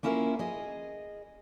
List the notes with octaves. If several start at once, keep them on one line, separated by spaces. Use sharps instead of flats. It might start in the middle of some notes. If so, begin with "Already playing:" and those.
A#3 C#4 E4 F4 A4 A#4
G#4 D#5